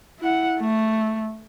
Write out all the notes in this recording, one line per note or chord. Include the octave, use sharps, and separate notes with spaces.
E4 F#5
A3